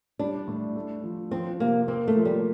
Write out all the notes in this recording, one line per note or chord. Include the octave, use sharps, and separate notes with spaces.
G3 D4
A2
A3
F3
F3 C4
C3 A#3
A#3 C4
A3
F3
G3